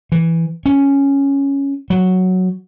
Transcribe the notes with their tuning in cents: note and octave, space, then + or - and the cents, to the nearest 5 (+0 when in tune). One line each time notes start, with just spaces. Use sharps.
E3 +5
C#4 +0
F#3 +0